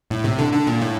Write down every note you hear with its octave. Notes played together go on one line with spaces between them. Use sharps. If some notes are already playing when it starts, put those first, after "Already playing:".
A2
C3
D3
D3
A#2
A2